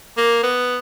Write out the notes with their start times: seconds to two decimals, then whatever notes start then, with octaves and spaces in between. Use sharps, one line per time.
0.17 A#3
0.43 B3